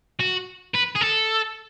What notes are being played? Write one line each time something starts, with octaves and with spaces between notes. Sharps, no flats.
F#4
B4
G#4
A4